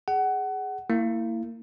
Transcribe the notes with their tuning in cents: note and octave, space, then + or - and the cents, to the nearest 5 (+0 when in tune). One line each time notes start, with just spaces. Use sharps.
G#4 +0 F#5 +25
A#3 -30 E4 +0